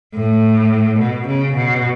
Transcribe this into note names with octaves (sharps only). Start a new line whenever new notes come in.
A2
B2
C#3
B2